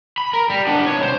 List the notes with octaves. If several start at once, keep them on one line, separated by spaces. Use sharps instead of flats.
B5
A#4
G3
B3 D4
C2 C#5
C5